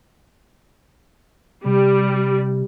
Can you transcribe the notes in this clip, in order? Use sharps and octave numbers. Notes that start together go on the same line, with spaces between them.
C3 G3